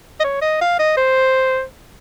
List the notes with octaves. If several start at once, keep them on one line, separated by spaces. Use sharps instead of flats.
D#5
C#5
D#5
F5
D#5
C5